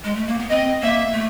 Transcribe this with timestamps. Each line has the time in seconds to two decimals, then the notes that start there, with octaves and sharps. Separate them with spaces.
0.04 G#3
0.15 A3
0.27 A#3
0.39 B3
0.50 C4 D#5
0.81 A#3 E5
1.13 A3